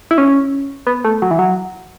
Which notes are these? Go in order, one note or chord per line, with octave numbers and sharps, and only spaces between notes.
E4
C#4
B3
A3
F#3
E3
F#3